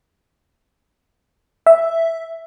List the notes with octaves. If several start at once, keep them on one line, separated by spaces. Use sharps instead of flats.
E5